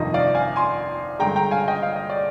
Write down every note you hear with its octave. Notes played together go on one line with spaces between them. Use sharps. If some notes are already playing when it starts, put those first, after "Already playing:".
Already playing: G1 F2 C3 D#3 D#5
D5 F5
F5 G#5
G#5 C6
G2 D3 G#3 G5 A#5
G5 A#5
F5 G#5
D#5 G5
F5
D#5
D5